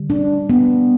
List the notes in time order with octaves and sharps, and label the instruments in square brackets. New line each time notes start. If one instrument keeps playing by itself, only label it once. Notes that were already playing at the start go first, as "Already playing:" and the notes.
Already playing: [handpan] D3 G3
D4
B3